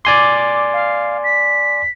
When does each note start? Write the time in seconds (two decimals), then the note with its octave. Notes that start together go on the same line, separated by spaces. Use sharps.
0.05 D5 G#5 C6 D6
0.73 F5
1.24 B6